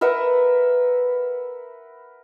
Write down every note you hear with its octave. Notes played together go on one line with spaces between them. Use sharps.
A#4 B4 E5 F#5